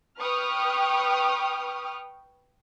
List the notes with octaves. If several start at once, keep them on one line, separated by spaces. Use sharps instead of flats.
B4 G5 C#6 D#6 F6